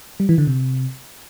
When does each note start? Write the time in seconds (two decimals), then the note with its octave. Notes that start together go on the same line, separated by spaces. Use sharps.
0.20 G3
0.29 E3
0.38 D3
0.47 C3